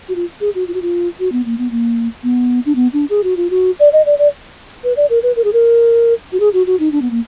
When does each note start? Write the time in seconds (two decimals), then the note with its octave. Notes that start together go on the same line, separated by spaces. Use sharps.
0.09 F#4
0.16 F4
0.41 G#4
0.55 F#4
0.68 F4
0.74 F#4
0.82 F4
1.20 F#4
1.32 B3
1.46 A#3
1.58 B3
1.71 A#3
2.24 B3
2.66 D4
2.76 B3
2.93 D4
3.10 G#4
3.24 F#4
3.37 F4
3.51 F#4
3.80 D5
3.93 D#5
4.06 D5
4.19 D5
4.84 B4
4.97 D5
5.10 A#4
5.23 B4
5.36 A#4
5.44 G#4
5.53 A#4
6.32 F#4
6.40 G#4
6.54 F#4
6.67 F#4
6.80 D#4
6.92 D4
7.02 B3
7.11 A#3